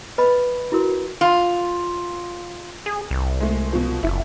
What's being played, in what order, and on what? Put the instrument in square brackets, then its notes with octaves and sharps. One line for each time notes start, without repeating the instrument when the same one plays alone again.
[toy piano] B4 D#5 B5
E4 F#4 A#4
[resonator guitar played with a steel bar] F4
[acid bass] G#4
C2
[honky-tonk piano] G#3 A3
B2 F3
[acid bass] F#1 [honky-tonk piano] E4